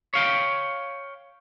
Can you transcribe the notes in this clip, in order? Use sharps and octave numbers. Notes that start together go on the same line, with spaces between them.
C#5 F5 G5